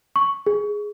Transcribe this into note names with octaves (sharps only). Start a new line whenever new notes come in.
C#6
G#4